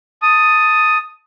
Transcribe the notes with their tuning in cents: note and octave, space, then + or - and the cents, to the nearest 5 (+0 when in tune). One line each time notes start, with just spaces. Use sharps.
A5 +10 D#6 +5